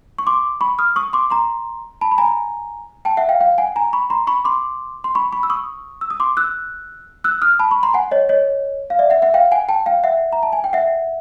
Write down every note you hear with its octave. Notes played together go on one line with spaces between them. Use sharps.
C#6
C6 D6
B5 C#6
D#6 F6
C#6 D#6
C6 D6
A#5 C6
A5 B5
B5
G#5 A#5
G5 A5
E5 F#5
F5 G5
F5 G5
F#5 G#5
G#5 A#5
B5 C#6
A#5 C6
B5 C#6
C6 D6
C6
B5 C#6
B5 C#6
E6
C#6 D#6
E6
D#6
C6 D6
E6 F#6
E6 F#6
D#6 F6
A5 B5
B5 C#6
A#5 C6
F#5 G#5
C#5 D#5
C#5 D#5
F5
D5 E5
E5 F#5
E5 F#5
F5 G5
F#5 G#5
G5 A5
F5 G5
E5 F#5
A#5
A5
G#5
G5
E5 F#5